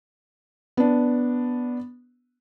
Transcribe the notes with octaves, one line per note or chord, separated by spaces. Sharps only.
B3 D4